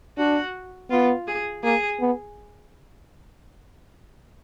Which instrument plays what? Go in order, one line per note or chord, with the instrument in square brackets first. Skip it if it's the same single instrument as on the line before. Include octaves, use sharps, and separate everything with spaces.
[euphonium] D4 [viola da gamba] F#4
[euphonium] B3 [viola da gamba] F4
[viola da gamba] G#4
[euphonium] A#3 [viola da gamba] G#4
[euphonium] B3